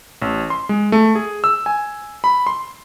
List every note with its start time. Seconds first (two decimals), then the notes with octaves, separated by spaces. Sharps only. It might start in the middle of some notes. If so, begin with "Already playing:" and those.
0.22 A1
0.50 C6
0.69 G#3
0.92 A3
1.15 G#4
1.44 E6
1.66 G#5
2.24 B5
2.47 C6